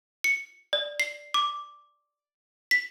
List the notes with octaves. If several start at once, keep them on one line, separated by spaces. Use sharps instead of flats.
C#7
D5
C7
D6
B6